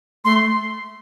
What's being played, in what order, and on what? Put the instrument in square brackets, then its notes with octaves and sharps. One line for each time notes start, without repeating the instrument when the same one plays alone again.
[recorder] A3 [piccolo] C6